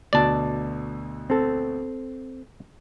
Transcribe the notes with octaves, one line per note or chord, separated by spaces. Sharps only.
D2 B2 D3 D5 A5
C4 A4